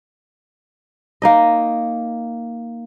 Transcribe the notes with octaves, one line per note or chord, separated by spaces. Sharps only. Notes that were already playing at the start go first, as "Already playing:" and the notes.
A#3 D#4 D#5